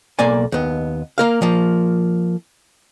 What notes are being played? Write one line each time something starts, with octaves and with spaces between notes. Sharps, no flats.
B1 A#3 D5 G#5
D#2 B3
A#3 A#4 F5
F3 A#3